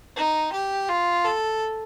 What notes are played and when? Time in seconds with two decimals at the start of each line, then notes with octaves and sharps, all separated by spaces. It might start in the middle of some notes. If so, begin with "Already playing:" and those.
0.16 D#4
0.53 G4
0.89 F4
1.24 A4